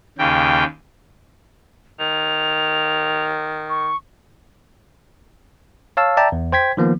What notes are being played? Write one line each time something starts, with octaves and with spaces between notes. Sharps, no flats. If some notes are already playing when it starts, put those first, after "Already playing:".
D#2 C#3 G5
D#3 F7
C#6
C#5 F5 A5 E6
D5 E5 G5 A5 A#5
E2
C5 G5 G#6 B6
D#3 F3 A#3 B3